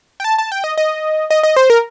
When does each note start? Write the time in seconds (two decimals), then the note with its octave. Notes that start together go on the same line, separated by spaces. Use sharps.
0.20 G5
0.24 A5
0.38 A5
0.52 G5
0.64 D#5
0.78 D#5
1.30 D#5
1.43 D#5
1.56 C5
1.70 A#4